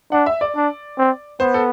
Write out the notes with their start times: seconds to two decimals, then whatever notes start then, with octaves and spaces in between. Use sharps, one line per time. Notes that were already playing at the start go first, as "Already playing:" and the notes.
0.12 D4 F#5
0.26 E5
0.41 D5
0.55 D4
0.98 C4
1.40 B3 C5
1.54 A4